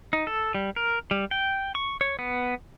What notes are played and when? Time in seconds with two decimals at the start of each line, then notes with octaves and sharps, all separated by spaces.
0.13 D#4
0.27 A4
0.55 G3
0.76 A#4
1.11 G3
1.31 G5
1.75 C#6
2.01 C#5
2.19 B3